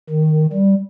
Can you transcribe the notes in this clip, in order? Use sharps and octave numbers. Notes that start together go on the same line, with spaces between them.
D#3
G3